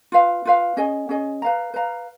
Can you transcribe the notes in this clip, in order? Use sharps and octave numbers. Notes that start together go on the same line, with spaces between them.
F4 B4 F5
F4 B4 F5
C#4 G#4 D#5 G#5
C#4 G#4 D#5 G#5
B4 F5 A#5
B4 F5 A#5